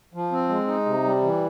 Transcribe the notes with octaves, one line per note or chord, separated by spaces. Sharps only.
F3
C4
G#3
D#4
C3
G3
E3